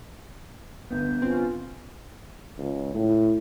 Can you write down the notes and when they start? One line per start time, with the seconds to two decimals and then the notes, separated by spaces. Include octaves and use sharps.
0.91 G1 B3 G6
1.22 C4 C#4 F4
2.58 C#2
2.94 A2